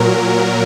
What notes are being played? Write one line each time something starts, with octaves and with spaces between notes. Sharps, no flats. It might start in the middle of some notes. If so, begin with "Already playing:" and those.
Already playing: A#2 F#3 A#4